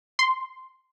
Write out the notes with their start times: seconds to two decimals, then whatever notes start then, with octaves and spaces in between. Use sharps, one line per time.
0.19 C6